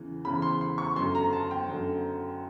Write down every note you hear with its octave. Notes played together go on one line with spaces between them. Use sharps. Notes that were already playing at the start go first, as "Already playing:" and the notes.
Already playing: E2 C#3 E3
E2 C#3 E3 B5
C6
C6
C#6
F#2 D3 C6
A#5
A5
G5
F#2 D3